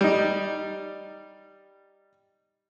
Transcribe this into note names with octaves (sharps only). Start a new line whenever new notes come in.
G3 D#4